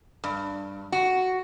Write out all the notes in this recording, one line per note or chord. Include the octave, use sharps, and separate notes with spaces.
G2
F#4